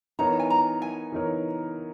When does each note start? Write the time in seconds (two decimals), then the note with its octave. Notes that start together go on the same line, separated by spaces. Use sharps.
0.19 E3 B3 D#4 A#4 C#5 A#5
0.39 G#5
0.50 A#5
0.82 G#5
1.12 E3 B3 D#4 A#4 C#5